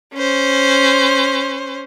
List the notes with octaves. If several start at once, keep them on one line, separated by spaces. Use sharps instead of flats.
C#4 C5